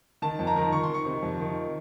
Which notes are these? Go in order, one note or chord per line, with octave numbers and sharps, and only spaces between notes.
D#3 A5
F2
A#5
D#3
D#3 C#6
C6
D#3
C#6
C3
F2
D#3